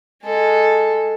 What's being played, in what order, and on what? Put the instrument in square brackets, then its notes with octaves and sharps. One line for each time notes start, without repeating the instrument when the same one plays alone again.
[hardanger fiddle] G#3 A4